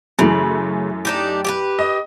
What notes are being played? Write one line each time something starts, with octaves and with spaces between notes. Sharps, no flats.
F#2 C#3 E3 A3
D4 D#4 G4
G4 G#4 B4
D#5